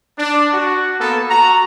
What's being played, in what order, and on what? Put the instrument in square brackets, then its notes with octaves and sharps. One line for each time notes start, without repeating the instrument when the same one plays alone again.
[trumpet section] D4
F#4
A#3 B3 A4
F#4 A#5